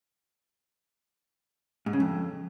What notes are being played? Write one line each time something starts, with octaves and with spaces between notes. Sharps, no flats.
G#2
C#3
F2